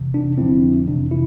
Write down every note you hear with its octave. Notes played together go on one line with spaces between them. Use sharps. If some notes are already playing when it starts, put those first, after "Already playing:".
Already playing: F2 C3 E3
D4
F2 D3 F3 C4 E4
F2 C3 E3 D4
E4